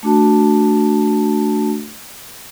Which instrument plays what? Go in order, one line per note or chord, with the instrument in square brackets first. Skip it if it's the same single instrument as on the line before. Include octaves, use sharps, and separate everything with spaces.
[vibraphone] A3 D4 F#4 A5